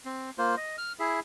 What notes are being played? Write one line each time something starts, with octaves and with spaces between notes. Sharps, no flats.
C4
A#3 F4 C5
D#5
F6
E4 G#4 E5